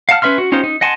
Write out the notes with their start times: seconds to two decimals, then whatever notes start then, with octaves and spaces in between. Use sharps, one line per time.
0.09 F5 F#5 A5 F6
0.22 C#4 B4 E5 C6 F6
0.38 F#4
0.52 C#4 D#4 F4 G4 C5
0.64 D#4
0.81 D#5 F#5 G#5 A5 C6